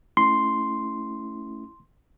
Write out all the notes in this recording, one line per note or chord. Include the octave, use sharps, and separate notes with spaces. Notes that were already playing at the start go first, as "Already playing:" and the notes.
A3 C#4 E4 C6